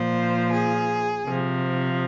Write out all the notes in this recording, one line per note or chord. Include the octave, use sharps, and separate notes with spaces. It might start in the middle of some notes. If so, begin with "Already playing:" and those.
Already playing: A#2 F3 C5
G#4
C3 F3